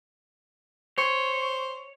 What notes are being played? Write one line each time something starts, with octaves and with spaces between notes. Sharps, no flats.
C5 C#5